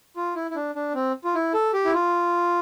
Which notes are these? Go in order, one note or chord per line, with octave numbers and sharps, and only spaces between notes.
F4
E4
E4
D4
D4
C4
F4
E4
A4
G4
E4
F4